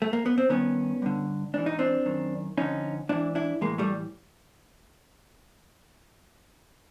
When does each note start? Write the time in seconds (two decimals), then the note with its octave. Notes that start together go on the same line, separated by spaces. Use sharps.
0.02 A3
0.13 A#3
0.26 B3
0.38 C4
0.49 G2 D#3 B3 C#4
1.02 G2 D3
1.54 G#2 E3 D4
1.66 D#4
1.79 C4 D4
2.05 F#2 D#3
2.58 F2 D3 C#4 D#4
3.09 G#2 E3 D4 E4
3.35 D4 E4
3.61 A2 E3 G#3 A#3
3.78 G3 A3